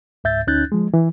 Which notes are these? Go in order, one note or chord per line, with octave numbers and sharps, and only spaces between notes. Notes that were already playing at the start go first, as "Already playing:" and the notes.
C#2 G#2 E5 G6 A6
D2 C#4 D#4 F#6 G6 A6
F3 G#3
E3